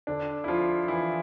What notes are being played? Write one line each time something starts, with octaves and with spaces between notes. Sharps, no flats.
D3 D4
E4
F3 F4
E3 E4